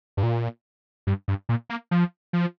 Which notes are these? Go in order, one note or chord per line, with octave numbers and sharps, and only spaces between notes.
G2
A#2
G2
G2
A#2
A#3
F3
F3